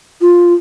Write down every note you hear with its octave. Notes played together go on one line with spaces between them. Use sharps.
F4